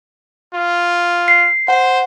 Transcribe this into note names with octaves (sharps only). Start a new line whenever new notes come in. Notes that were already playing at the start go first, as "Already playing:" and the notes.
F4
C7
C5 F#5